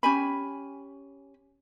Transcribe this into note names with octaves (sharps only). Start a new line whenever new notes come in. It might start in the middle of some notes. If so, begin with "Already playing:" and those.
C#4 G4 G#5 B5